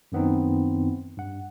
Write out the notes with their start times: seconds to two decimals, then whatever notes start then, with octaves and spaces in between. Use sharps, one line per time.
0.12 F#2 D#3 B3 C4 D#4
1.17 G2 F#5